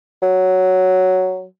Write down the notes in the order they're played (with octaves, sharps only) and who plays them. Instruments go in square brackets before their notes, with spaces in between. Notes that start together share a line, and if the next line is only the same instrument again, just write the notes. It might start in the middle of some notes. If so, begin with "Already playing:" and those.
[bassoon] F#3